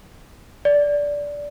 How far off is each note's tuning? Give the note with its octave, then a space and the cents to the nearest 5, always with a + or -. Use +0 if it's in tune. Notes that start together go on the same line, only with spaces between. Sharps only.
D5 -15